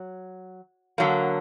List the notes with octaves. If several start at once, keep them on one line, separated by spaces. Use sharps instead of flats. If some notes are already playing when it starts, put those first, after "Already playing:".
Already playing: F#3
D3 F#3 A#3